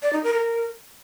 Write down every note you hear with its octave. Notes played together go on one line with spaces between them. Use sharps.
D5
D#4
A#4
A#4